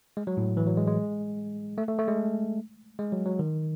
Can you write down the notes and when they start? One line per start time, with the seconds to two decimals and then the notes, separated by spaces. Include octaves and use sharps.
0.17 G#3
0.27 F#3
0.37 A2
0.57 E3
0.67 F#3
0.77 G#3
0.87 G#3
1.78 A3
1.88 A3
1.98 A3
2.08 G#3
2.99 G#3
3.12 F#3
3.26 F#3
3.39 D#3